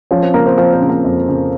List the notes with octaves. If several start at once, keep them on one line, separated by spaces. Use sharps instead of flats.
F3 C#4 C#5
C4 C5
C#3 A#3 A#4
C4 C5
F3 C4 C5
C4 C5
C#3
A#3 A#4
F2
C#3